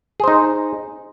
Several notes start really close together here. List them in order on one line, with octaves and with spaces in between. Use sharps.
G#4 C5 D#4